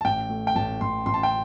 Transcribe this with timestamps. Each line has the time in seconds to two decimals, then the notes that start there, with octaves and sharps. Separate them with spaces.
0.01 A5
0.05 A1 G5
0.30 A3
0.47 G5
0.56 A1 A5
0.81 A1 C6
1.06 A1 C6
1.14 A5
1.23 G5